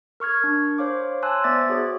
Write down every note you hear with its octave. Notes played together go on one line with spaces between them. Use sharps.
A#4 C#6 F6 G#6
D4
C5 C#5 F5 D6
G#5 A5 C6 E6 F#6
B3 C5 D5 E5 D6 A6
F#4 G#4 C#5